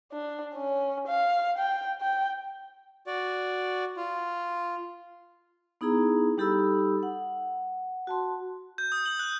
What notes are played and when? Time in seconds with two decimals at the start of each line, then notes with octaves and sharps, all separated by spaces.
0.12 D4
0.55 C#4
1.08 F5
1.58 G5
2.01 G5
3.07 F#4 D5
3.97 F4
5.81 B3 D#4 E4 G#4 A#5
6.38 G3 D#4 G4 A4 B5 E6
7.03 F#5
8.07 F#4 A5 C6
8.78 G6
8.92 D#6
9.06 F#7
9.19 F#6